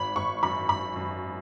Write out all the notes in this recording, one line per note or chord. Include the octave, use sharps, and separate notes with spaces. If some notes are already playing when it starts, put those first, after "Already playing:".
Already playing: G#1 B5
G#1 C#6
F#2 B5
G#1 B5
F#2